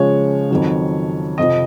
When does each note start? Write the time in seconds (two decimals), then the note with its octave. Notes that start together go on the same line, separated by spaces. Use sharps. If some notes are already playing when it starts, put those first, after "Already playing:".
Already playing: C#3 F3 G#3 C#5
0.51 F2 D#3 F#3
1.38 F2 C3 F3 D#5